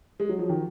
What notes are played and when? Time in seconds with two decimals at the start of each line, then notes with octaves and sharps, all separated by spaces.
0.20 G#3
0.29 F#3
0.39 F3
0.49 D#3